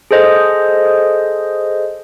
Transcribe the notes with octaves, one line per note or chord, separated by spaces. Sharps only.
G#4 A4 C5 D#5